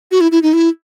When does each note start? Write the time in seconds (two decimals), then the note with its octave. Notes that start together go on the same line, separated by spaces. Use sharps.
0.11 F#4
0.21 E4
0.32 E4
0.43 D#4
0.53 E4